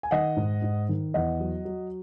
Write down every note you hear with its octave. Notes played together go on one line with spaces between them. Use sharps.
G#5
D#3 D#5 F#5
G#2
G#2
D#3
E2 D#5 F#5
F#3
F#3